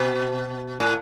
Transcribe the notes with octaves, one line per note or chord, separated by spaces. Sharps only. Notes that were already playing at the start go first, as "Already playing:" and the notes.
Already playing: B2
A2